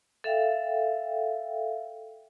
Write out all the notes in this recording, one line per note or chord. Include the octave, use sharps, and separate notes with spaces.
A4 E5 F5 G5